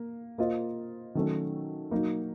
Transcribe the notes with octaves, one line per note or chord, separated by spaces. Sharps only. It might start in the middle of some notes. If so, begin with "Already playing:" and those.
Already playing: A#3
A#3 F4 C5 D#5
D#3 F#3 A3 C#4
F#3 A#3 D#4